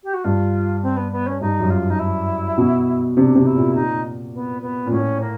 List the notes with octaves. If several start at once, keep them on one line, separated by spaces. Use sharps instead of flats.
G4
F#4
G2 F4
C4
B3
B3
C#4
G2 D#4
F#2
F4
D#4
E4
B2
C3 D4
C3
E4
A#2
D#4
B3
B3
A#2
A2 C#4
A#3